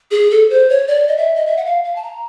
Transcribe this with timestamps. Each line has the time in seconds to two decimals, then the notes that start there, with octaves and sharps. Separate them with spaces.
0.11 G#4
0.30 A4
0.50 C5
0.69 C#5
0.87 D5
1.08 D#5
1.17 E5
1.35 D#5
1.46 E5
1.57 F#5
1.65 F5
1.84 F5
1.96 A5
2.03 A#5